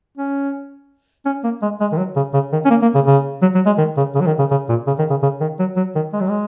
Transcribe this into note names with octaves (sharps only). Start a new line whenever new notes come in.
C#4
C#4
A#3
G#3
G#3
D#3
F#3
C#3
C#3
D#3
C#4
A#3
A#3
C#3
C#3
F#3
F#3
G#3
D#3
C#3
C#3
F#3
D#3
C#3
C#3
A#2
C#3
D#3
C#3
C#3
D#3
F#3
F#3
D#3
G#3
F#3
G#3